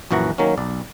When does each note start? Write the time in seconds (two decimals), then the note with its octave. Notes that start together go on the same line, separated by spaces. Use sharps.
0.11 A#1 F#2 E3 F#4 F#5 A#5
0.38 D#3 F#3 A#3 C#4
0.58 B1 D5